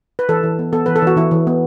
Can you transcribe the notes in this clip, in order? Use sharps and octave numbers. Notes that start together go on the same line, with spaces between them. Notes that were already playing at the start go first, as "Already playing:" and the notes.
B4
E3 A4
E3
B3
B3 A4
E3 B4
A4
E3 F#4
E3 E4
E3
B3